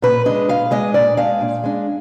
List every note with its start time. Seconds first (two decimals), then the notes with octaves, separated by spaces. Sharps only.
0.02 A#2 B4
0.26 G#3 D4 D#5
0.49 A#2 F5
0.71 G#3 D4 D#5
0.94 A#2 D5
1.17 G#3 D4 F5
1.40 A#2
1.64 G#3 D4